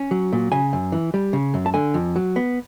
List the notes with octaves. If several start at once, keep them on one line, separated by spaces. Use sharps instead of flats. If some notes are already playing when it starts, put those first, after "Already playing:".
Already playing: C#4
F#3
A#2
C#3 G#5
F#2
E3
G3
C#3
F#2
A5
D3 G#5
F2
F#3
B3